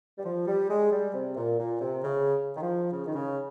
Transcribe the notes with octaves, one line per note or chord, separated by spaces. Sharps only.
G3
F3
G3
G#3
G3
C3
A#2
A#2
C3
C#3
D#3
F3
C#3
D#3
C#3